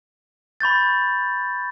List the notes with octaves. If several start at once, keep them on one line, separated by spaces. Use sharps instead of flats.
B5 C#6 G6 A6